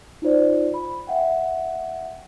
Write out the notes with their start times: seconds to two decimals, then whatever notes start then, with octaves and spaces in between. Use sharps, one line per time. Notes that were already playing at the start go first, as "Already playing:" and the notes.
0.22 D#4 F4 C5 D5
0.74 B5
1.07 E5 F#5 G5